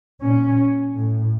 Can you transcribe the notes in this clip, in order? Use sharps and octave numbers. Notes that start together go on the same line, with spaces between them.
A#2 C#4
A2